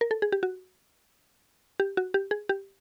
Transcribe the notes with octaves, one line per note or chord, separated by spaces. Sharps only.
A#4
A4
G#4
G4
F#4
G4
F#4
G4
G#4
G4